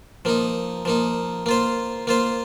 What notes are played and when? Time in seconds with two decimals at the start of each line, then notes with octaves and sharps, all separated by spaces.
0.25 F3 A#3 D#4
0.85 F3 A#3 D#4
1.46 A#3 F4 C5
2.07 A#3 F4 C5